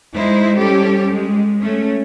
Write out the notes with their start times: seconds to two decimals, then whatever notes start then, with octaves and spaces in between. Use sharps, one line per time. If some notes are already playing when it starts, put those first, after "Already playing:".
0.13 G#3 D#4 E4 C5
0.57 G3 C#4 G4 A4
1.12 G#3
1.61 A3 C#4